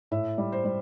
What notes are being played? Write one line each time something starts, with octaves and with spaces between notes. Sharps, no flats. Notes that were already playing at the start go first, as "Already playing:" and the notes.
A2 E5
G3
C5
G3